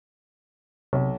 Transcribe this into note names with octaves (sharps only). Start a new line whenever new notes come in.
B1 C3